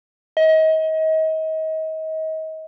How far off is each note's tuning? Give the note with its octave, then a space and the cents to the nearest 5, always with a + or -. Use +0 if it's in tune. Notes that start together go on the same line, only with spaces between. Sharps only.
D#5 +35